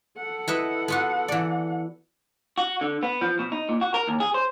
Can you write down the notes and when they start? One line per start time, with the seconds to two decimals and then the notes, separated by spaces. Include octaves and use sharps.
0.17 A4 F#5
0.48 E4 B4 D#5
0.88 B3 F4 F#4
1.28 E3 D5
2.58 F#4
2.81 D3
3.03 B3
3.21 F3
3.39 B2
3.52 D#4
3.69 A#2
3.81 F#4
3.94 A#4
4.08 D#2
4.20 G#4
4.34 C5